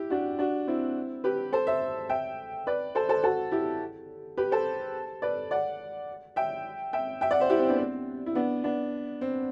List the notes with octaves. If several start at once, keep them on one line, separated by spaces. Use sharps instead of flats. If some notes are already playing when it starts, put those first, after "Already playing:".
Already playing: E4 G4
D4 F#4
D4 F#4
C4 E4
G4 B4
A4 C5
C5 E5
E5 G5
B4 D5
A4 C5
A4 C5
F#4 A4
E4 G4
G4 B4
A4 C5
B4 D5
D5 F#5
E5 G5
E5 G5
E5 G5
D5 F#5
C5 E5
E4 G4
C4
B3 D4
C4
E4
B3 D4
B3 D4
C4